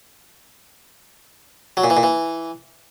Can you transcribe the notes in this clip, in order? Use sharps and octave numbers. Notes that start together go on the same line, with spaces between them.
F#3
A#2
E3
A#2
E3